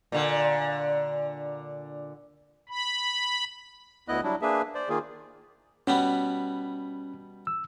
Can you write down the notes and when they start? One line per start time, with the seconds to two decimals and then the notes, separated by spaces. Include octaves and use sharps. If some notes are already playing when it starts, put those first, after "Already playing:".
0.12 A#2 D3
2.69 B5
4.08 D2 B3 E4 D#5 F#6
4.23 F#3 G3 D4 E4
4.42 A#3 D4 G#4 B4 E5
4.75 C5 D5
4.89 D#3 A#3 F4 G#4
5.87 B2 G3 B3 C#4
7.47 E6